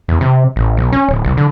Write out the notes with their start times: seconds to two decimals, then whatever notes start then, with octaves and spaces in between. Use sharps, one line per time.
0.08 E2
0.21 C3
0.56 A1
0.77 B1
0.92 C#4
1.09 D1
1.25 C2
1.37 D3